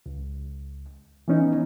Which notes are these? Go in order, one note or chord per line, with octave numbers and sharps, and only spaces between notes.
C#2
E3 B3 C#4 D#4